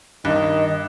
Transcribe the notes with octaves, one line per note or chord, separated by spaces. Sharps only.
G2 D#3 D#5